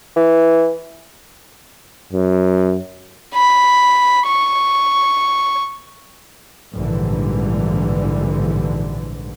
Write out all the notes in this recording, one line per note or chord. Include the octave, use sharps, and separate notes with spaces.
E3
F#2
B5
C#6
A#1 G#2 D3 E3 G3